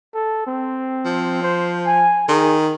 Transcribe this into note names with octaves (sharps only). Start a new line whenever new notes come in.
A4
C4
F3
C5
G#5
D#3 G#4